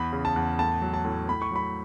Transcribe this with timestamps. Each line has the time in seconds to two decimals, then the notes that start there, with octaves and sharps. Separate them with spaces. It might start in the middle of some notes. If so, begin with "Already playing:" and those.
Already playing: E2 B5
0.12 C#3
0.25 A5
0.36 E2
0.59 A2 A5
0.82 F#3
0.93 A5
1.05 A2
1.28 A2 B5
1.42 C#6
1.51 F#3 B5